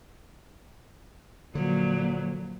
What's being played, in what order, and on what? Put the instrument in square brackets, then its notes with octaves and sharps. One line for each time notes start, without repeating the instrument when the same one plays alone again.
[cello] A#2 F#3 [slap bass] D3 F3